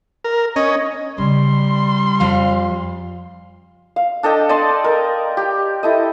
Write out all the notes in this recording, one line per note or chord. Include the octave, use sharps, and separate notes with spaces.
A#4
C#4 D#5
C#3 G3 C6
F2 F3 F5
F5
D4 A4 D#5 G5
D5 D#5 A5 C6
A#4
G4
E4 A4 D#5